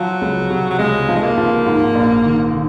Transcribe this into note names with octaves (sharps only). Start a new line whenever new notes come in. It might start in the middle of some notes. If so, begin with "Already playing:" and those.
Already playing: F3 F#3
C#2
C3
F#3
C#2 G#3
F3
G#3
A#3
F3
G#2
A#1
D#3
D#3